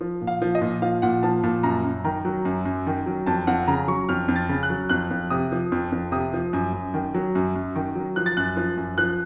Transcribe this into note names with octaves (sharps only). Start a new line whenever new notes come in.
F3
A#2
F5
F3
D#5
A#2
F3 F5
A#2 F#5
F3 A5
A#2 A5
F#2 A#5
F#2
D#3 A#5
F#3
F#2
F#2
D#3
F#3
F2 A5
F2 F#5
C#3 A#5
F#3 C#6
F2 F6
F2
A6
C#3
F#6
F#3
F2 F#6
F2
C3 D#6
F3
F2
F2
C3 D#6
F3
F#2
F#2
D#3
F#3
F#2
F#2
D#3
F#3
F3 F#6
A6
F#2 F#6
F3
F#2
F3 F#6